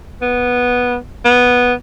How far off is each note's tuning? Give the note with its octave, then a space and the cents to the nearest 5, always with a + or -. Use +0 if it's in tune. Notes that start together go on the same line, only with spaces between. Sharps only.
B3 -10
B3 -5